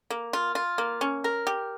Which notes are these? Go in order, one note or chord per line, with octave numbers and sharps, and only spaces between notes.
A#3
F4
F4
A#3
C#4
A#4
G4